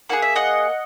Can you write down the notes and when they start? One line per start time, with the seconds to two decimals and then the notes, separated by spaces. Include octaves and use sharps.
0.09 A#3 E4 G#4 F#5
0.22 E5
0.36 D#5 F#5